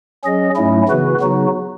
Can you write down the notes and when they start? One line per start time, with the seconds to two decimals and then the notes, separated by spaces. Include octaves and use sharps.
0.24 F#3 C#4 G#4 D#5
0.56 G#2 F#3 A3 C#4 E4
0.88 C#3 E3 B3 F#4 B4
1.20 C#3 F#3 B3 D#4 F#4